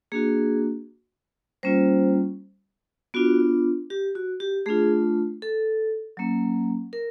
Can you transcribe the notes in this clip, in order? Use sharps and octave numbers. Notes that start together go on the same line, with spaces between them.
A#3 D4 F#4 G#4
G3 A#3 C#4 F4 C5
B3 D4 F4 F#4
G4
F#4
G4
A3 D4 F4 G#4
A4
F#3 A#3 C#4
A#4